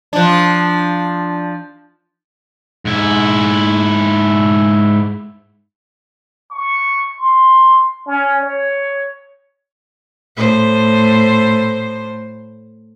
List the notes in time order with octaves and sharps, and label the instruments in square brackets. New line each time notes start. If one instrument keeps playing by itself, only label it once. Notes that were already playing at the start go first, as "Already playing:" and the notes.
[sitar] F3 D4
[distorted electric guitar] G#2 E4
[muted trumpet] C#6
C6
C#4
C#5
[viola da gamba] A2 C5